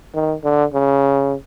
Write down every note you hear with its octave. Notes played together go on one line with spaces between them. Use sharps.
D#3
D3
C#3